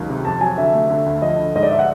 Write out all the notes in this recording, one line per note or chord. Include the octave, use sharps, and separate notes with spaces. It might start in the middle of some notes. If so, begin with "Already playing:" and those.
Already playing: C#2 D#3 F#3 G3
C3
F2 A5
F#3 G#5
D3 E5
A3
D3
D2
F3 D#5
D3
G#2 D#5
D5
E5
F#5